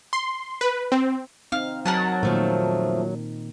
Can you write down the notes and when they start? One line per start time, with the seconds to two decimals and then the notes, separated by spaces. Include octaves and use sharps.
0.13 C6
0.61 B4
0.92 C4
1.52 C4 D#4 F5
1.86 F#3 A#4 F#5 A5
2.23 F2 A#2 D#3 F3 A3